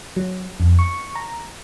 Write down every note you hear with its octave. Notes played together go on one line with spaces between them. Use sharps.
F#3
F2
C#6
A#5